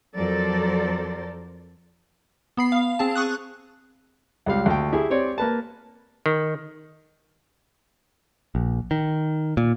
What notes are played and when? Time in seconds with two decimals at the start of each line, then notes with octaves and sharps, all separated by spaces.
0.16 F2 F#3 A4 A#4 C5 D5
2.57 B3 B5 C7
2.72 F5
2.99 C4 G#4 A5
3.15 C#6 D#6 F#6
4.46 C#2 G3 F5
4.66 D2 G5
4.93 E4 G4 G#4
5.10 C4 G4 C#5 D5
5.38 A#3 B4 A5
6.26 D#3
8.55 A#1
8.91 D#3
9.57 A#2